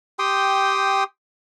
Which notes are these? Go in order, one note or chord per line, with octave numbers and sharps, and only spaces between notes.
G4 G5 C6 D#6